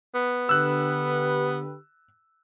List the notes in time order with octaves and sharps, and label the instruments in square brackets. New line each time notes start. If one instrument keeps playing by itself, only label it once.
[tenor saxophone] B3
[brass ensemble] D3 G4 B4 [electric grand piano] E6 F#6